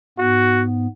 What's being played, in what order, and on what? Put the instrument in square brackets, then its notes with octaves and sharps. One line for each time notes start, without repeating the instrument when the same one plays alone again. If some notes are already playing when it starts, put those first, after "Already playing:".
[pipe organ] G#2 B3 [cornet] F#4